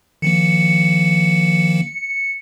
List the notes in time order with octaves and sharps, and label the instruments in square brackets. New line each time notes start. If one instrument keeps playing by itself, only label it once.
[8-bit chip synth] D#3 F3 A#3 [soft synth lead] C#7